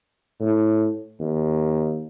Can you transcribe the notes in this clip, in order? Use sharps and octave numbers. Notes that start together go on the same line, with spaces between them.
A2
D#2